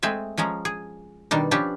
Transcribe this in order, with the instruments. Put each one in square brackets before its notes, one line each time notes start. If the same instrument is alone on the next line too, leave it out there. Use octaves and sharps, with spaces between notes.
[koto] G#3 A3 C4 G#4 E5
F3 G#3 C#4 A#5
G#4
B2 D#3 G3 D4
F3 C#4 D4 G4 B4